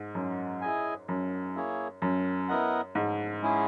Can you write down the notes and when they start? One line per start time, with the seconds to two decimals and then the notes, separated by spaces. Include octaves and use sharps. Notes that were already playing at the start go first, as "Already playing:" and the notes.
Already playing: G#2
0.15 F#2
0.61 E4 G#4 D#5 G#5
1.08 F#2
1.56 A#3 E4 G#4 C#5
2.02 F#2
2.48 B3 E4 A#4 D#5 F#5
2.95 G#2
3.42 G#3 C#4 E4 G#4